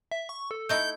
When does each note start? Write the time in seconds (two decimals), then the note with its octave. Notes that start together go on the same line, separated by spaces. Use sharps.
0.11 E5
0.29 C#6
0.51 A4
0.69 A3 D#4 E4 G6